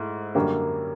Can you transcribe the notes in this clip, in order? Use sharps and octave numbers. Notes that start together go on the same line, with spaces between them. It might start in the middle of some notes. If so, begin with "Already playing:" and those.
Already playing: G#2 A3 E4
F#2 D3 G3 A#3 C#4